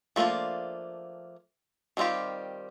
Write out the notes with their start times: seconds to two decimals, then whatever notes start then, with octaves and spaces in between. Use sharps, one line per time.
0.16 F3 A3 A#3 D4 F4
1.97 D#3 G3 C4 F4 G4